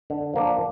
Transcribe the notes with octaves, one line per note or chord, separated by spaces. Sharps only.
D3
F3 A#3 D4